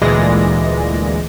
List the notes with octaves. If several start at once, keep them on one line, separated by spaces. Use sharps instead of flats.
D2 A#2 E3 G#3 D5 A#6